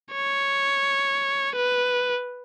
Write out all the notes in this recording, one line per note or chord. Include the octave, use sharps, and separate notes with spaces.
C#5
B4